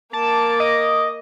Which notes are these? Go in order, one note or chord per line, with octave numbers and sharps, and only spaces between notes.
A#3 A5 D6
D#5